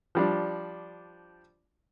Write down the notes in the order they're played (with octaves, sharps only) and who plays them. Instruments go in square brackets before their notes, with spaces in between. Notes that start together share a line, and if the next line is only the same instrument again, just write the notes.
[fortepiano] F3 G3 D4